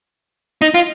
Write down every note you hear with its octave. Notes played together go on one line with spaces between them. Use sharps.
D#4
F4